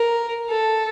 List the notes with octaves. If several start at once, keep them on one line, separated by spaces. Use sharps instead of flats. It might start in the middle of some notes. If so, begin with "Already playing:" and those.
Already playing: A#4
A4